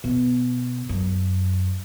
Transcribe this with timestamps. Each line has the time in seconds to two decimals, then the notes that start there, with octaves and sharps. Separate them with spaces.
0.04 B2
0.89 F#2